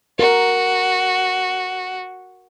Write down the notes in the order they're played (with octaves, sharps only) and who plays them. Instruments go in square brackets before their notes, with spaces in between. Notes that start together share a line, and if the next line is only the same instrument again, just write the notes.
[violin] F#4 [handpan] A#4